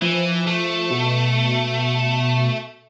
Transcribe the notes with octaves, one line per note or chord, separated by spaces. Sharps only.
E3 F3
A3
B2